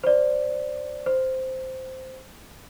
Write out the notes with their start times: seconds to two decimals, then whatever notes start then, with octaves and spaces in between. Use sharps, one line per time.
0.04 C5 D5
1.06 C5